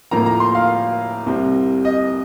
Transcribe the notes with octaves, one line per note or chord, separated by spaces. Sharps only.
A2 F3 A#3 A#5
A#5
C6
F5
C2 C3 G3 C4
D#5